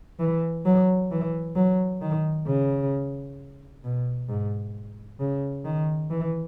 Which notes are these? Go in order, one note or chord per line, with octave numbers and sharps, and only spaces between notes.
E3
F#3
E3
F#3
D#3
C#3
B2
G#2
C#3
D#3
E3